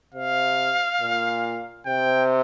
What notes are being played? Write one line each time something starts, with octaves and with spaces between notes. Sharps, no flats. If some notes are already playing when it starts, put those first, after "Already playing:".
C3 F5
A#2
C3 G5